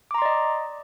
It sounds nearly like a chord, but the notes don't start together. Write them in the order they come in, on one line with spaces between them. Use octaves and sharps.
D6 A#5 C6 D5 D#5